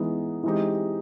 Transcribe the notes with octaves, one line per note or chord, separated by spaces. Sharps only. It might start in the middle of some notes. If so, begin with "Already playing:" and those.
Already playing: E3 G#3 B3 D#4
E3 G#3 C4 D#4 G4